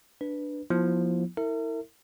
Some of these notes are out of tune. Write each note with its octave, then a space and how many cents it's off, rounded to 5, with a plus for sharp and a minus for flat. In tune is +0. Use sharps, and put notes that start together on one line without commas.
D4 +0 B4 +0
F3 +10 B3 -35 E4 +0
E4 -30 A#4 -40 E5 +0